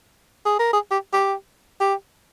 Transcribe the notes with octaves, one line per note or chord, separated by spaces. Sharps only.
G#4
A#4
G#4
G4
G4
G4